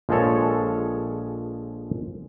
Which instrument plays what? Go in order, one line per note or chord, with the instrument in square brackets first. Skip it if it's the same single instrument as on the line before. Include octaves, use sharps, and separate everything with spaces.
[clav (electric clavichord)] A#1 F3 G#3 G#4 A4 C#5